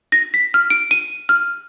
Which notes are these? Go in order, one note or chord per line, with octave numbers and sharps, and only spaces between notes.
A#6
B6
F6
D7
D#7
F6